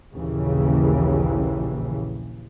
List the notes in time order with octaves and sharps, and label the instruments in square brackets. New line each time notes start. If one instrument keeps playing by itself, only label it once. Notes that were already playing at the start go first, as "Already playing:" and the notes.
[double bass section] A#1 D#2 C#3 E3